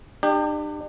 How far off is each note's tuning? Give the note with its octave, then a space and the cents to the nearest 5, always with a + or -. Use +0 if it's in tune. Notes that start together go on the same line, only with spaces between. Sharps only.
D4 +40 G4 +15